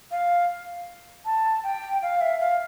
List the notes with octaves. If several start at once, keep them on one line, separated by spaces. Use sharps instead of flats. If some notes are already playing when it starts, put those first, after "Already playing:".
F5
A5
G5
F5
E5
F5